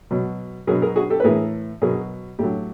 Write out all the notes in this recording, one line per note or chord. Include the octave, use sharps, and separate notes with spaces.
B2 F#3
B2 F#3 G#4 A#4
G#4 A#4
F#4 G#4
G4 A4
B4
A2 E3 G#4 A#4
B2 F#3 G#4 A#4
A2 F#3 G4 A4